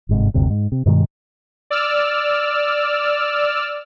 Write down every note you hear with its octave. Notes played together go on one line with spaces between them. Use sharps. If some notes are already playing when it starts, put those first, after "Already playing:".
G1 G#2 C3
F#1 D2 G2 C3
G#2
C3
G2 B2 D#3 G#3
D5 E6 F6